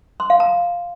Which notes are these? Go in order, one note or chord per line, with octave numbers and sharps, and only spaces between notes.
C6
F5
A#5